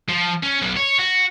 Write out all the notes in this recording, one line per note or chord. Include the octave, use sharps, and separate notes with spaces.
F3
C#4
B1
C#5
F#4